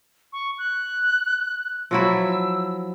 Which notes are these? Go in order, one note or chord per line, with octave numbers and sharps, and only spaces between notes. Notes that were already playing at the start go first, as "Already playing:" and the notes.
C#6
F#6
F3 F#3 E4 E6